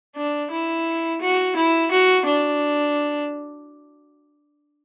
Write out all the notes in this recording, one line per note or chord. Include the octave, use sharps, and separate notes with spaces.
D4
E4
F#4
E4
F#4
D4